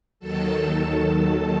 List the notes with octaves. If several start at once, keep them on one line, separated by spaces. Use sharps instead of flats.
D#2 D#3 F#3 A4 A5